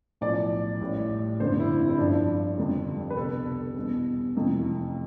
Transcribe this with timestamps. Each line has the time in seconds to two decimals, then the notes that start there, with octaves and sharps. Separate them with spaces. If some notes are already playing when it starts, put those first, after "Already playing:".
0.21 B1 A2 F3 D5
0.81 A1 A2 G3
1.40 G1 F2 D3 G3 C5
1.60 E4
1.78 C4
1.90 E4
1.98 G1 G2 F3 D4
2.58 G1 F2 D3 G3
3.10 B4
3.16 C2 B2 G3 A4
3.76 E2 B2 G3
4.36 F1 F2 C3 E3